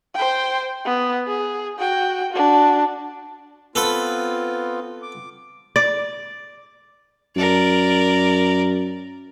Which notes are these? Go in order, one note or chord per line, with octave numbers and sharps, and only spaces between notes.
C5 G5
B3
G#4
F#4 G5
D4 F#4
B3 C4 F4 A4 B4 B5
D6
D5
F#2 A#4 D5